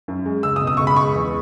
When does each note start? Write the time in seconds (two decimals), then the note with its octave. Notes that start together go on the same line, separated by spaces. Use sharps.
0.08 F#2
0.25 G#3
0.43 C#2 E6
0.56 D#6
0.62 B2
0.67 D#6
0.77 C#2 C#6
0.87 B5
0.96 G#3 C#6
1.15 E2